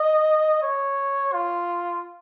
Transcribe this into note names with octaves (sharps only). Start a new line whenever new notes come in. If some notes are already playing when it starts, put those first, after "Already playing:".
Already playing: D#5
C#5
F4